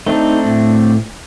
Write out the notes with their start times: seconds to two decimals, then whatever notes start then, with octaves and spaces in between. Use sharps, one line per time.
0.06 A3 C4 D4 D#4
0.45 A2